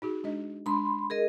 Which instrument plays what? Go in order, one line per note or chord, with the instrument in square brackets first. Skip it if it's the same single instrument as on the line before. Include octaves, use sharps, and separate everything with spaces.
[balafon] D#4 F#4 G#4
G#3 D4 D#5
[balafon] G#3 D4 [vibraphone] B5 C6
[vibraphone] G#4 A#4 D#5